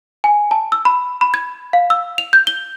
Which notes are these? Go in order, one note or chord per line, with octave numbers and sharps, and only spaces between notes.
G#5
A5
E6
B5
B5
G#6
F5
E6
F7
G6
G7